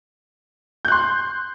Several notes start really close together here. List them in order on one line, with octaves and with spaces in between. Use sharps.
G6 F#6 C6